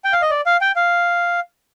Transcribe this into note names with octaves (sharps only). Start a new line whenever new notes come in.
G5
F5
D#5
D5
F5
G5
F5